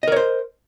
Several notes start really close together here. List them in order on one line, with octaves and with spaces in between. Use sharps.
D#5 A#4 C#5 C5